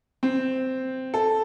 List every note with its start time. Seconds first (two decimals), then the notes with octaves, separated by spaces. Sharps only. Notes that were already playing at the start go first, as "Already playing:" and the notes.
0.23 C4
1.14 A4